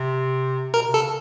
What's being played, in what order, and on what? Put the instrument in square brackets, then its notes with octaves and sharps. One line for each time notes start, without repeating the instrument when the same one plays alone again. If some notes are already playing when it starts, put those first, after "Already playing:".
Already playing: [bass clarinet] C3
[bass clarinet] B2 [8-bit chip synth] A#4
[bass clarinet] C3
[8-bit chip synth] A4
[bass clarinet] C#3